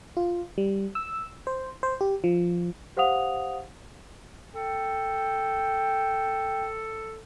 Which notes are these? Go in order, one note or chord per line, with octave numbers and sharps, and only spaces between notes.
F4
G3
E6
C5
C5
G4
F3
G4 C5 F5 F#5 D#6 F7
A4 G5